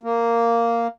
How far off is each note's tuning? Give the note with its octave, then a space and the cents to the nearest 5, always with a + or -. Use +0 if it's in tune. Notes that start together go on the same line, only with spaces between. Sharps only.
A#3 -5